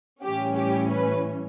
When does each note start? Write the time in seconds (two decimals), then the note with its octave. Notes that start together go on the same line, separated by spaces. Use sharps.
0.22 A2 E3 G3 C#4 G4
0.57 G4
0.91 B4